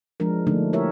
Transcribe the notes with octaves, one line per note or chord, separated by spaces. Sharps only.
F3 G#3 D4 A#4
D3 F3 A3 A#3 D4 D#4
E4 G4 A#4 C#5 E5